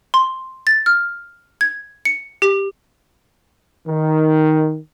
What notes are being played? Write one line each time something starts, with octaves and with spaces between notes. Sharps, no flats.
C6
A6
F6
G#6
C#7
G4
D#3